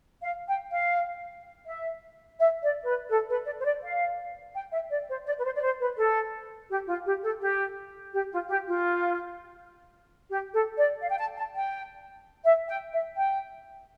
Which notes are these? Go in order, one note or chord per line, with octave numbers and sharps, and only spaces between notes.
F5
G5
F5
E5
E5
D5
B4
A4
B4
D5
C5
D5
F5
G5
E5
D5
C5
D5
B4
C5
D5
C5
B4
A4
G4
F4
G4
A4
G4
G4
F4
G4
F4
G4
A4
D5
F5
G5
A5
A5
G5
E5
G5
E5
G5